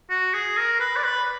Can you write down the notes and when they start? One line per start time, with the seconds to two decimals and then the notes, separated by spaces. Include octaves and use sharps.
0.10 F#4
0.34 G#4
0.58 A#4
0.80 B4
0.97 D5
1.04 B4